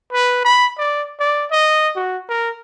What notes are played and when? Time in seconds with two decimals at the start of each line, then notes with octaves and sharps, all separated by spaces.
0.13 B4
0.45 B5
0.78 D5
1.20 D5
1.52 D#5
1.96 F#4
2.29 A#4